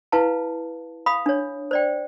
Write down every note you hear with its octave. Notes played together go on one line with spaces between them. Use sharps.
E4 B4 F5 A5
F5 B5 D#6
D4 C#5
C5 D5 G5